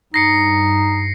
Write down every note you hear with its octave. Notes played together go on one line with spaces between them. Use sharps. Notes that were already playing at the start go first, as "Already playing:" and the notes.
G2 D#4 A#6 C7 C#7